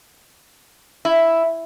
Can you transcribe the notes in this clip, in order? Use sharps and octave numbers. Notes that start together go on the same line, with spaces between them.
E4